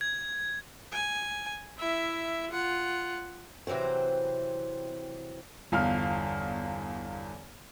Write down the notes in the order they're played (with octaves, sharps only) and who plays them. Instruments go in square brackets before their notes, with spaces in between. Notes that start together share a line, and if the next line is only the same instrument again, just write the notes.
[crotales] G#6
[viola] G#5
E4 E5
F4 F#5
[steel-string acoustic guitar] C3 E3 F#3 C4 C5
[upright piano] G1 E2 F5 F6